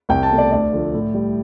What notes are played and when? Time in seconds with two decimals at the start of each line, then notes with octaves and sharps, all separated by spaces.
0.09 C2 G5
0.23 A5
0.30 B2 A3
0.38 D5
0.52 D2 D5
0.72 D3 F3 A3
0.94 A2
1.14 G3